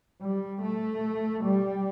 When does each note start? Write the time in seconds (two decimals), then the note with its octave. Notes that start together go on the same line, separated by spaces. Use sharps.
0.22 G3
0.62 A3
1.44 G3